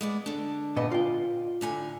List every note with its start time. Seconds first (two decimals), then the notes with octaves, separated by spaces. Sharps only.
0.01 G#3 B3 D5
0.26 D3 D4
0.76 A#2 B3 D#5
0.92 F4 G5
1.61 A2 D3 G#5